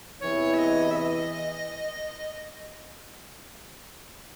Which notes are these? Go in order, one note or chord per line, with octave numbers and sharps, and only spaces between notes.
E2 C3 E3 C#5
E5
D#5
E5
D#5